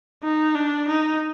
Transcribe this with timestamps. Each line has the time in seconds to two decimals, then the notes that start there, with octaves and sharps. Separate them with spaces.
0.24 D#4
0.55 D4
0.88 D#4